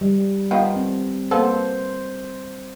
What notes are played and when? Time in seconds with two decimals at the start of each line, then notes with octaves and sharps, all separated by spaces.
0.01 G3
0.51 D#3 F3 B3
0.76 C4
1.31 A#3 B3 A4 C5